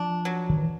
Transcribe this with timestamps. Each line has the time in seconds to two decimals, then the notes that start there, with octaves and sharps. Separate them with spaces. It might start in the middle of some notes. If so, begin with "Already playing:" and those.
Already playing: F3 D4
0.25 F#3
0.50 D#3
0.57 E3